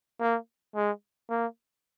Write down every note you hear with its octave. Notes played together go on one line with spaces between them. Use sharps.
A#3
G#3
A#3